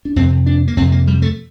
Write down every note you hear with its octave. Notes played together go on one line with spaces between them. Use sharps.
D4
F2 C3 C4
D4
A#3
F2 C3 C4
A#3
G3
A3